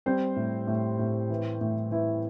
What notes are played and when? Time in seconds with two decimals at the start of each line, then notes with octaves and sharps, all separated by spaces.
0.06 G3 C4 C5
0.36 A2
0.67 A2
0.99 A2
1.30 E3
1.61 A2
1.91 E3 E4